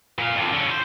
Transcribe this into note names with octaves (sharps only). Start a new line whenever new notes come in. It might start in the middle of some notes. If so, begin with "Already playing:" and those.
A#2 F5
F2 D3
D3 C#4
C5